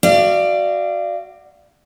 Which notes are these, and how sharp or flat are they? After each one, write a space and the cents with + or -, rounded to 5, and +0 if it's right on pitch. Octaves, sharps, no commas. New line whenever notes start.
F#4 +0 D5 +15 F5 -30